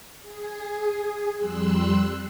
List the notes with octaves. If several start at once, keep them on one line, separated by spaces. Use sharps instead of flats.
G#4
F2 G3 C6 E6 F#6